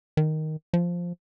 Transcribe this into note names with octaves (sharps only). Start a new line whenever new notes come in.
D#3
F3